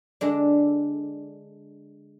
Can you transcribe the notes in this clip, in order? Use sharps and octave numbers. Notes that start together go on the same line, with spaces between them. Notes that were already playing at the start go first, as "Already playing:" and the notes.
D3 G#3 D4